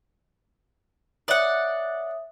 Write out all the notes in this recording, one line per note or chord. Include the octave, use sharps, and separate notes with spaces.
C#5 D5 E5 F#5 D#6